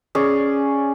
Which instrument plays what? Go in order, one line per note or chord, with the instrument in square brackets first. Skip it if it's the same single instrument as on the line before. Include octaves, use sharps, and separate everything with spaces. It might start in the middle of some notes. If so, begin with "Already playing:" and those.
[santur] C#4 G#4 D5